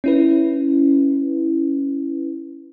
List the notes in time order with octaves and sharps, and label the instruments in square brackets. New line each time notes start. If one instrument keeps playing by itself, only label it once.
[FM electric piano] C#4 E4 B4